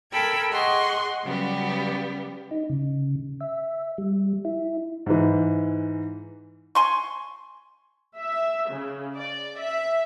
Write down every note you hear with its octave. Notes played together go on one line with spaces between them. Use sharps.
A4 A#4 G5 B5 E6 G#6
G#4 D#5 F#5 C6 C#6
C#3 F#3 G3 B3 G4
D#4
C#3
E5
G3
E4
G#2 E3
G#5 C6 C#6
E5
C#3
D5
E5